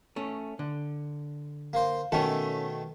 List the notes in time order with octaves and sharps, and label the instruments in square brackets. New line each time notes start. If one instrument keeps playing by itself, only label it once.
[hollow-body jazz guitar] A3 C#4
D3
[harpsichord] A#3 C5
[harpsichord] B2 D#3 A3 [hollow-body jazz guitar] C#4 A4